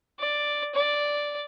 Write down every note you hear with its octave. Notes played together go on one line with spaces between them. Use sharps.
D5
D5